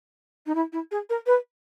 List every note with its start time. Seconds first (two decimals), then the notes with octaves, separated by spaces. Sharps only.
0.46 D#4
0.54 E4
0.72 E4
0.91 G#4
1.09 A#4
1.26 B4